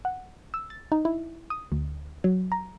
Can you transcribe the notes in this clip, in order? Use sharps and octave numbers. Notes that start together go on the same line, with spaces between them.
F#5
E6
A6
D#4
E4
D#6
D2
F#3
A#5